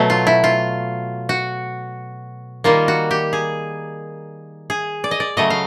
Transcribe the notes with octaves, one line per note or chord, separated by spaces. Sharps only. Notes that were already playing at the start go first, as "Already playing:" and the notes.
Already playing: B2 F#3 A3
F4
E4
F4
F#4
D#3 G3 A#3 F4
F#4
G4
G#4
G#4
D5
D#5
D5
C#3 F#3 A3 D#5
F5